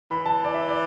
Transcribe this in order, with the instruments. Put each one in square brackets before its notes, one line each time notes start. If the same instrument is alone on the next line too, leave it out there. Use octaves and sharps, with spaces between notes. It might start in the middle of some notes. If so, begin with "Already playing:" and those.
[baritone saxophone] E3 [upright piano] B5
[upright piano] A5
D5
E5
D5